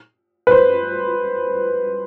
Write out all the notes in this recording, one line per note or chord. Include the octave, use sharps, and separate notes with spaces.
B4
C5